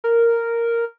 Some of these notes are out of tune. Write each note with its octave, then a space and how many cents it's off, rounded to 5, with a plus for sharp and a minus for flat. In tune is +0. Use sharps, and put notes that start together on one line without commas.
A#4 -5